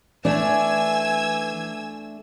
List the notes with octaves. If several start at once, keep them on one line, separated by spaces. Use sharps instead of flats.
E3 A3 D4 G#5 E6 G#6